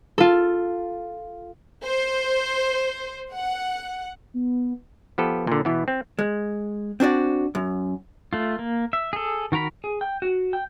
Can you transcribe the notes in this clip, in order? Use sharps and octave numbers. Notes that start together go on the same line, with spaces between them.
F4 A4
C5
F#5
B3
F3 B3 G4 A4 B4
A#2 D3
B2 E3 B3
C4
G#3
C4 D4 F#4 D5
F#2
A3 F4
A#3
E5
G#4 A4
D#3 F#4 A#4 A#5 B5
G#4
G5
F#4
G5